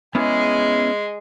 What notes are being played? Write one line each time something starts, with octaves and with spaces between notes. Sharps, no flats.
G#3 B3 C#4 E4 G#4